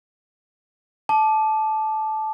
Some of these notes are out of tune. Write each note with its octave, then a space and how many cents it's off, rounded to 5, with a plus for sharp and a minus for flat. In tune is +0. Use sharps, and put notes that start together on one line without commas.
A5 -15 D6 +20